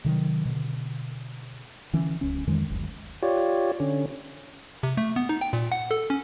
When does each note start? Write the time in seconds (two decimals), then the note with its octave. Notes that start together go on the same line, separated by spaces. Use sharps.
0.05 C3 D#3 F#3
0.45 B2 D3
1.93 D3 E3 C#4
2.21 D1 C#2 C#4
2.47 F2 D#3 E3 G#3
2.70 F#1 D2
3.23 F4 G4 C#5 D5
3.80 D3 C#4
4.83 C3
4.97 A3
5.16 B3
5.29 D#4
5.41 G5
5.53 A#2
5.72 F#5
5.91 A4
6.10 C#4